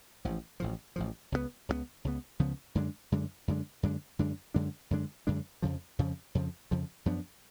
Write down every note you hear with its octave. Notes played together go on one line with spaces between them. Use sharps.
A1 A2 F3
A1 A2 F3
A1 A2 F3
C#2 C#3 F3 B3
C#2 C#3 F3 B3
C#2 C#3 F3 B3
C#2 C#3 F3 B3
F#2 D3 G#3 D4
F#2 D3 G#3 D4
F#2 D3 G#3 D4
F#2 D3 G#3 D4
F#2 D3 G#3 D4
F#2 D3 G#3 D4
F#2 D3 G#3 D4
F#2 D3 G#3 D4
F2 C#3 F3
F2 C#3 F3
F2 C#3 F3
F2 C#3 F3
F#2 F3 B3 D4